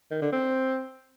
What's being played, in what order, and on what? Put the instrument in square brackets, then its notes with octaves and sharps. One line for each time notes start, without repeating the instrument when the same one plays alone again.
[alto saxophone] D#3
D3
C4